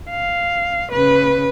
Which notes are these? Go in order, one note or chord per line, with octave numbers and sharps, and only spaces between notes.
F5
C#3 B4